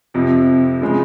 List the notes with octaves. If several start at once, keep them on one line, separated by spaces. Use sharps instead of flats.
F2 C3 F3
C#3 F3 G#3